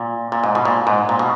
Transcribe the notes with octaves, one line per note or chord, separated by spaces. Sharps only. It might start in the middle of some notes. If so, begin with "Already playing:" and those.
Already playing: A#2
A#2
G#2
B2
A#2
G#2
A#2
B2